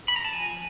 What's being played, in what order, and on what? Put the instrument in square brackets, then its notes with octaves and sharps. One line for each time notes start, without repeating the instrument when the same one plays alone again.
[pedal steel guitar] B5
A#5
A5
F3 G#5